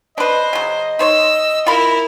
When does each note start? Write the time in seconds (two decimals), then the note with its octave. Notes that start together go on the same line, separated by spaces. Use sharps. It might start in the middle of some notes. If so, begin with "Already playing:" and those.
0.18 D4 B4 C5 D#5
0.53 C#3 F#3
0.99 D#4 C5 C#5 E6
1.67 E4 F4 A#4 B5